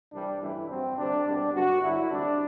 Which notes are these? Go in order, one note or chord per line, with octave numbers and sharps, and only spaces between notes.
C2 C3 E3 G3 D4
A1 G2 E3 G3 E4
G2 F#3 C4
D2 C3 G3 D4
C2 B2 G3 D4
G2 D3 F#3 F#4
G2 D3 F#3 E4
D2 C3 G3 D4